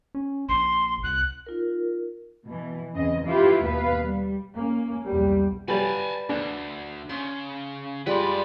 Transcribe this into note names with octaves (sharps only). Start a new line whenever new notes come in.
C#4
A#1 C6
C2 F#6
D#4 F4 A#4
B2 E3
E2 C#3 C4 D#5
E4 F4 G4 B4 E5 F5
D#2 B2 B3 B4 F5
G3
A#3 C#4
B1 E2 G3
F#3 G3 B4 D5 F5 G#5 A5
D2 D4
C#3 C6
G3 G#3 F4 B4 D5